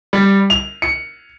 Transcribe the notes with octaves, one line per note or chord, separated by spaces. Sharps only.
G3
F7
C#7